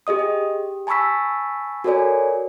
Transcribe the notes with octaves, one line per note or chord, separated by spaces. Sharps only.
G4 G#4 D#5 D#6
G4
G#5 A5 B5 C#6 E6 B6
F#4 A4 A#4 C#5 D5 G#5